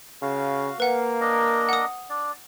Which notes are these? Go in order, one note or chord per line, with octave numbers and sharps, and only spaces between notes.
C#3 F#4 F5
A#3 B4 F5 F#5
D4 A#4 D#5
F#5 D#6
D4 D5